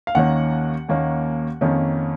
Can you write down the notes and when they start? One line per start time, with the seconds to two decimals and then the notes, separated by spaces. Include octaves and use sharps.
0.07 F5
0.15 D#2 D#3 A#3 C#4 F#5
0.89 D#2 D#3 A#3 C#4
1.61 F2 D#3 A#3 C#4